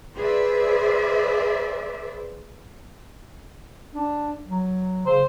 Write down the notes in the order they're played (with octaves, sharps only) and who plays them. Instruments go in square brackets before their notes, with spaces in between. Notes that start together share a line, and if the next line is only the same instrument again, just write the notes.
[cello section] G#4 B4 C5 D5 E5
[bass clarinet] D4
F#3
[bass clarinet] C#3 [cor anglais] C5